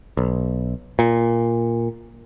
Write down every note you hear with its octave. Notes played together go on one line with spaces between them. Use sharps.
B1
A#2